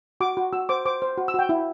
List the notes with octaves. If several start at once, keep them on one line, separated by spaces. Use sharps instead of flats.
F#4 D6
F#4
F#4 E6
C5 D6
C5 D6
C5
F#4
E6
F#4 G5
E4